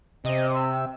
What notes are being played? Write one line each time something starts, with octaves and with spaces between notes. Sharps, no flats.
C3 C4 D#5
E6